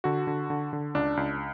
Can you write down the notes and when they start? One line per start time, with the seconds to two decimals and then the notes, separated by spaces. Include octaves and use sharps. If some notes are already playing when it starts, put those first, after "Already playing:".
0.04 D3 F#4
0.27 D3
0.50 D3
0.73 D3
0.95 C#2 D4
1.17 C#2